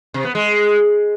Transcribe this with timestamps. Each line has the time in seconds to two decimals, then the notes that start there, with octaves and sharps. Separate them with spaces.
0.14 C3
0.25 B3
0.35 G#3